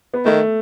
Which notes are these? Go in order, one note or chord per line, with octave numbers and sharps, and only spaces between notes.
B3
D#3 A3